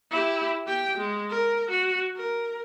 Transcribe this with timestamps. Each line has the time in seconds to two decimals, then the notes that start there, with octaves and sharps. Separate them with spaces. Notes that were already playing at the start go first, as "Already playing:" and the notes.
0.11 E4 G4
0.66 G4 G5
0.98 G#3
1.30 A#4
1.70 F#4
2.16 A#4